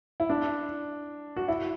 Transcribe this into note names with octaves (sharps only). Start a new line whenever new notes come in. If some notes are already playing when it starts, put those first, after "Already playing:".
E4
D4
F#4
E4